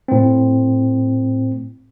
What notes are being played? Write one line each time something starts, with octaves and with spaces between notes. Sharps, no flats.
A2 C4